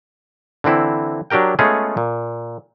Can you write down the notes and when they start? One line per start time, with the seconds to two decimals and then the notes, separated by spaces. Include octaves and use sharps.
0.64 D3 E3 C4 E4
1.30 F#3 D4 G4 A#4 G5
1.59 G#3 A3 B3 C#4 F4 G#4
1.97 A#2